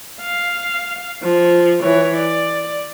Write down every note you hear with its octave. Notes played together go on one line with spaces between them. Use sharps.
F5
F3
E3 C#5
D5